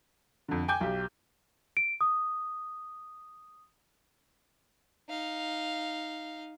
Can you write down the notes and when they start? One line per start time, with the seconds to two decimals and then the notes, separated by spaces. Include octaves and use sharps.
0.48 F2 D3
0.68 G5 G#5 D6 G6
0.81 B1 G4
1.77 D7
2.01 D#6
5.09 D#4 F5